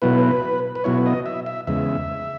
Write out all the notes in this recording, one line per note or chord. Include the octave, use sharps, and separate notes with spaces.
B2 F#3 B3 E4 B4
B4
B2 F#3 B3 E4 C#5
D#5
E5
E5
E2 C#3 G#3 E5